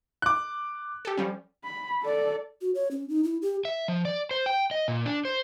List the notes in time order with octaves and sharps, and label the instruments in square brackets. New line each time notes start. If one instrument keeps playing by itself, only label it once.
[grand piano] D6 F#6
[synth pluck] G4 A4
F3 G3 C#4
[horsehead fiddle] B5
A4 D5
[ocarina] F#4
C#5
C#4
D#4
E4
G4
[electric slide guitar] E5
F3
D5
C5
G5
D#5
A#2
D4
C5